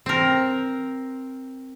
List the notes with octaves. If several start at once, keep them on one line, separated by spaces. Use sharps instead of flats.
C4 A#4